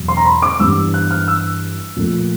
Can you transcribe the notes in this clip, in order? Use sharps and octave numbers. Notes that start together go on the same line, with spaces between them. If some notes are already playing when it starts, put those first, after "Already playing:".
Already playing: E2 B2 F#3
C6
A#5
B5
D6
G2 E3 G3 B3 D4 E6
F#6
F6
E6
A#2 F3 A3